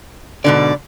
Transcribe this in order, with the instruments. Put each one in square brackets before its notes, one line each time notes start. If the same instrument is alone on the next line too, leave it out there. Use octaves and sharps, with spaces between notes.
[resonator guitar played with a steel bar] G#2 B2 D3 [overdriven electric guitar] D5